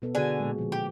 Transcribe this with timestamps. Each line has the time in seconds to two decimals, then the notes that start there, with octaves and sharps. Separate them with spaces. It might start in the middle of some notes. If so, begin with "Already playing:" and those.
0.02 B2 B3 A4
0.15 D3 F#4 G#4 G#5
0.40 A#2 G#3
0.58 D3 F3
0.72 G4